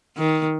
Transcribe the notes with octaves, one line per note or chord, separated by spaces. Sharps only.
D#3